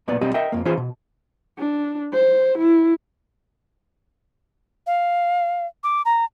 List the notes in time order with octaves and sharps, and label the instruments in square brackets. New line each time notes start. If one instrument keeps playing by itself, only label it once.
[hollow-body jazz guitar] B1 A#2 B3 D5
B1 G3 C4 G4 D#5
A#4 D#5 E5 G5
F2 A#3
E3 C#4 F4 G#4 C5
B2
[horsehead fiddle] D4
C5
E4
[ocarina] F5
D6
A#5